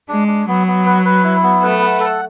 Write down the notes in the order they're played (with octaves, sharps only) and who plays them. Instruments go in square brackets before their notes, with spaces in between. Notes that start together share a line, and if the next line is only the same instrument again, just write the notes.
[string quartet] G#3 [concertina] D4
[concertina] D4
[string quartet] F#3 [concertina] B3
[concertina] B3
B4
B4
E4
B3
[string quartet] A3 [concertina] B4
[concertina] F#5
A4